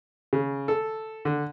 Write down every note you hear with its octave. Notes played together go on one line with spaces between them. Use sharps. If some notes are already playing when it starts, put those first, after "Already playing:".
C#3
A4
D3